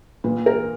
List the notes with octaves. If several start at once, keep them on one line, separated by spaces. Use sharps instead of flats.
A#2 B4
A#4